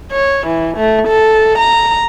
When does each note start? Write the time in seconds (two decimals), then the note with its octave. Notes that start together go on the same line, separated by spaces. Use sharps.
0.12 C#5
0.47 E3
0.77 A3
1.08 A4
1.58 A#5